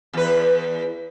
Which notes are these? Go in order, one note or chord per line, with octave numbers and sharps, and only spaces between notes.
E2 B4